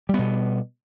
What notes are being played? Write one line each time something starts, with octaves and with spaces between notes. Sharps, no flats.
B2 G3 B3